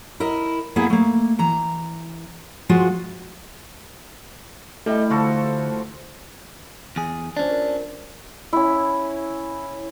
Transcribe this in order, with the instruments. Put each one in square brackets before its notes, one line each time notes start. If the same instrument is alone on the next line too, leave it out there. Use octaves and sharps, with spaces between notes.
[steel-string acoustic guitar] E4 A#4 D#5
A#3 B3 E4 G#4
A3 A#3
E3 A#5
F3 G#3 F4 F#4
[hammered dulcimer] G3 [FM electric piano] A3 E4 [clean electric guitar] A4 D#5 G5
[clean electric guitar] D2 [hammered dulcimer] F3 F#4 A4
[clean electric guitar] E2 G#4
[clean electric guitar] C#4 D4 [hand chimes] F4 C5 D5
[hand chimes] A#4
[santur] C#4 E4